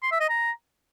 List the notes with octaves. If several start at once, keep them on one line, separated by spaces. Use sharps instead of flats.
C6
E5
D#5
A#5